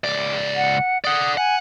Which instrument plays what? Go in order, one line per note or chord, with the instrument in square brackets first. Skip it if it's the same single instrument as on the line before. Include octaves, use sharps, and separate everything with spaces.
[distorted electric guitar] C#2 D5
[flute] F#5
[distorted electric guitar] D5 F#5 [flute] D#6
[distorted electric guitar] F#5 [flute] G#5